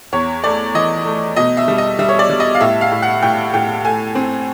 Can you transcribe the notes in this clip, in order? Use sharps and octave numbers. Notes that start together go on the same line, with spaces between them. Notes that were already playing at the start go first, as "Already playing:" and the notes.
E2 C#5
A3 D5
E3 D#5
A3
B2 D#5
E5
G3
D#5
G3 E5
C#5
D5
G3
D#5
F5
A2 E5
F5
A2
F#5
A2 G5
A2 G5
A3 G#5
C4